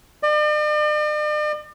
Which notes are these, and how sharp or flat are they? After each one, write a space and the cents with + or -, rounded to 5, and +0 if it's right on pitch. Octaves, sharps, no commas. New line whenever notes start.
D5 +45